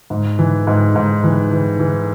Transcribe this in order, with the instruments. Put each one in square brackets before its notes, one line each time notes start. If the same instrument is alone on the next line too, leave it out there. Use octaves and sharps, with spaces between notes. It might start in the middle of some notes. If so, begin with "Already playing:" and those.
[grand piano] G#2
E3
G#2
G#2
E3
E3
E3